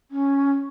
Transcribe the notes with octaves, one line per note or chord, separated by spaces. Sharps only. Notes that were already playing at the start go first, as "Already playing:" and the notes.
C#4